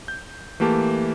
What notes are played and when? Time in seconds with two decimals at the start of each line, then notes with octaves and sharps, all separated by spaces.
0.08 G6
0.60 E3 A3 A#3 G4 A5